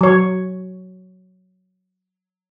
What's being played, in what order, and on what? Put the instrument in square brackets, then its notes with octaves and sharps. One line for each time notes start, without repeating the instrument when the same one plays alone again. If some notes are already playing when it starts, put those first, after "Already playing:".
[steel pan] F#3 C#5